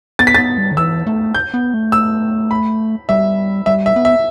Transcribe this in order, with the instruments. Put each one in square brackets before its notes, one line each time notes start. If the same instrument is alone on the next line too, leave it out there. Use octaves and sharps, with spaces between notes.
[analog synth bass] B3 [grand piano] A6
[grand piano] B6
A6
[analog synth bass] B3
G3
D3
[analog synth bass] E3 [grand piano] E6
[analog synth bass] A3
[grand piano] G6
[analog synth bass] B3
A3
[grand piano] E6
B5
[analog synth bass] G3 [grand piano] E5
[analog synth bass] G3 [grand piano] E5
[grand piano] E5
[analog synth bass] B3
[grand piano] E5